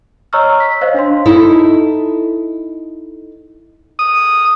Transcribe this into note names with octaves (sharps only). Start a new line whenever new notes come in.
C#5 D#5 A#5 C#6 E6 F6
B6
C5 C#5 D#5 F5
D4 F5 C6
D#4 E4 A4
D#6